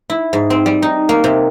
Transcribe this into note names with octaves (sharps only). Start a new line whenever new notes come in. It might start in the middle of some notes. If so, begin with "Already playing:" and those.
E4
G#2
C4
G3
D#4
A#3
C3